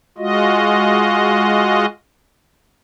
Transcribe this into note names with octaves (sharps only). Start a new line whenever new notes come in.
G#3 F4 F#4 D#5